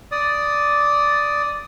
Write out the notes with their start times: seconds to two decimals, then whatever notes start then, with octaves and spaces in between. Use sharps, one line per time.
0.12 D5 D#6